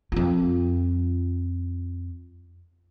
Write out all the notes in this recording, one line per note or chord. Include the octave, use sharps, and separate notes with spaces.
F2 F4